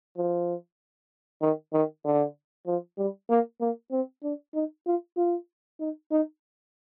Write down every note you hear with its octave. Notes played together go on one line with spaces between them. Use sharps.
F3
D#3
D#3
D3
F3
G3
A#3
A#3
C4
D4
D#4
F4
F4
D#4
D#4